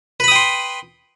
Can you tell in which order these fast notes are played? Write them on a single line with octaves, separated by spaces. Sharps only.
B4 B5 D#6 G5 C6